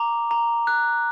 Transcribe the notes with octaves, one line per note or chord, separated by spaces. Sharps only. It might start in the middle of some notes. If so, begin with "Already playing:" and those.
Already playing: A#5 D6
A#5
F#6